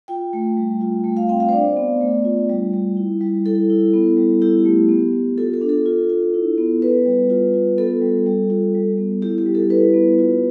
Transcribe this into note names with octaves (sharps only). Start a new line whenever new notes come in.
F4 G5
A3
G3
F4
A3
F5
C4 G5
F5
C5
D4 D5
B3
A3
F4
G3
G3
E4
G3
E4 A4
E4
B3
G3
E4 G4
A3
B3
B3
F4 A4
A4
D4
A4
F4
F4
E4
B3
B3 B4
G3
F4
F4
B3 A4
G3
G3
F4
G3
B3
E4 G4
G4
G3
A4
E4 B4
B3
F4